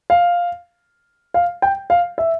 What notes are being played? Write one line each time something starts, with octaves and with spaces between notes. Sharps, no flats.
F5
F5
G5
F5
E5